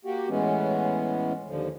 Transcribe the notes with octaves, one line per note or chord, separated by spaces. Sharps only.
A#3 F#4 G4
A2 E3 G#3 B3 C#4
D#2 D3 F3